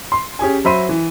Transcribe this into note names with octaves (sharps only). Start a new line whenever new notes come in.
C6
C#4 G4 G#4 G#5
F#3 C5 E5 B5 C6 D#7
E3